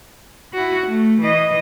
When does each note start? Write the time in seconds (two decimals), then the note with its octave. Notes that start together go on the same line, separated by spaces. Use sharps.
0.54 E4 F#4
0.87 A3
1.21 E3 D#5